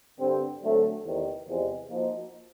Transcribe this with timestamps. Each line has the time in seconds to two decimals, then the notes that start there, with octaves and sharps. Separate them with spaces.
0.19 G2 D3 G3 C4
0.62 D3 F#3 A3 C4
1.04 E2 C3 D#3
1.47 E2 C3 F3 G#3
1.90 F3 A#3 D#4 F#4